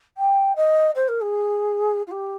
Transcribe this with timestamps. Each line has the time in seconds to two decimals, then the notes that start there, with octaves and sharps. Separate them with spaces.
0.17 G5
0.56 D#5
0.95 C5
1.08 A#4
1.21 G#4
2.07 F4
2.11 G4